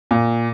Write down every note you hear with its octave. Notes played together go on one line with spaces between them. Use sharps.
A#2